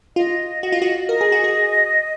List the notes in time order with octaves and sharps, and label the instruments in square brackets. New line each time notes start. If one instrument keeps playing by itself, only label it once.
[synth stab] F4 [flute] D#5
[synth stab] F#4
F4
F#4
[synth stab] A#4 [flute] D#5
[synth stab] G#4
F#4
G#4